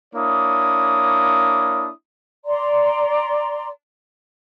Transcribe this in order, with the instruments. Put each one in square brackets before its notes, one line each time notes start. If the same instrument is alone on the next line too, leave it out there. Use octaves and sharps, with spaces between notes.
[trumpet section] A#3 D4 E4 C#5 D#6
[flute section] D5 A#5 C6